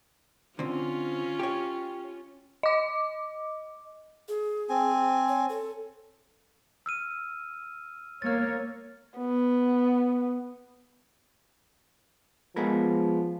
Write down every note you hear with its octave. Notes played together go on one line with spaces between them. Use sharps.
D3 C4 C#4 F4
G4 C#5
D#5 D6
G#4
C4 G#5
C#5
A4
E6 F6 D#7
A#3 C#5 F6 A6
B3
F3 G#3 B3 A#4